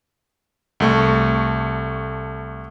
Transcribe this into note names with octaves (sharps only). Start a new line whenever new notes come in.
C2 A3 C#6